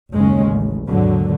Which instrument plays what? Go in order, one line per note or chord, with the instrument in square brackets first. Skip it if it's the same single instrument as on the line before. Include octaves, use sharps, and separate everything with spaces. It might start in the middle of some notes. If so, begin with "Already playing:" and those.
[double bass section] F#1 D#2 C#3 G#3 C#4
A1
G#1 D#2 B2 D3 F#3